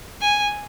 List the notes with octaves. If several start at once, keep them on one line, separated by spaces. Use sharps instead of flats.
G#5